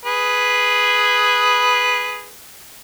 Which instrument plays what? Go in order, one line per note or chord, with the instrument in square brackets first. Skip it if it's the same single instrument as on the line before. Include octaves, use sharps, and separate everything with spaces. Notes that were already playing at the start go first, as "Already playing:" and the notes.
[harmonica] G#4 B4